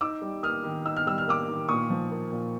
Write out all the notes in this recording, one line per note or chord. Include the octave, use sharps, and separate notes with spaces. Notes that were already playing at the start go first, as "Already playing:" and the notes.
D#4 D6 E6
G3
A#3 D#6 F6
D#3
D#4 E6
F6
G3 E6
F6
A#3 D6 E6
D#3
A#2 C#6 D#6
F3
A#3
A#2